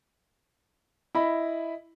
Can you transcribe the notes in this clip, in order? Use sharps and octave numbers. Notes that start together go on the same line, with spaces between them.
E4 D#5 B5